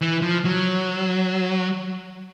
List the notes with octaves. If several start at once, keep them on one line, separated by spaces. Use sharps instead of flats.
E3
F3
F#3